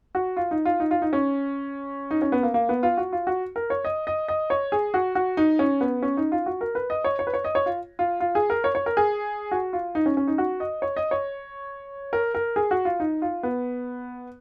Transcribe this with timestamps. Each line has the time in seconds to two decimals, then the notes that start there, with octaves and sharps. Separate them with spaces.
0.15 F#4
0.37 F4
0.51 D#4
0.65 F4
0.80 D#4
0.91 F4
1.02 D#4
1.13 C#4
2.11 D#4
2.22 C#4
2.32 B3
2.43 A#3
2.54 A#3
2.69 B3
2.83 F4
2.97 F#4
3.13 F4
3.27 F#4
3.56 A#4
3.70 C#5
3.85 D#5
4.07 D#5
4.28 D#5
4.50 C#5
4.72 G#4
4.94 F#4
5.15 F#4
5.37 D#4
5.59 C#4
5.81 B3
6.03 C#4
6.17 D#4
6.32 F4
6.46 F#4
6.61 A#4
6.75 B4
6.90 D#5
7.04 C#5
7.19 C#5
7.27 B4
7.34 C#5
7.44 D#5
7.55 C#5
7.66 F4
7.99 F4
8.20 F4
8.35 G#4
8.50 A#4
8.64 C#5
8.75 C#5
8.86 A#4
8.97 G#4
9.51 F#4
9.73 F4
9.95 D#4
10.06 C#4
10.17 C#4
10.27 D#4
10.38 F#4
10.60 D#5
10.82 C#5
10.97 D#5
11.11 C#5
12.13 A#4
12.35 A#4
12.56 G#4
12.71 F#4
12.85 F4
13.00 D#4
13.22 F4
13.43 B3